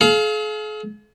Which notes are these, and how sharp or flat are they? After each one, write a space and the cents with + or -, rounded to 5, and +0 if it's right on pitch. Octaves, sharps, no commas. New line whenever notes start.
G#4 +45 F5 +0